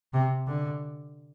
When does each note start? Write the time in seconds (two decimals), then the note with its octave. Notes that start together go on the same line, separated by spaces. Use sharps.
0.13 C3
0.47 D3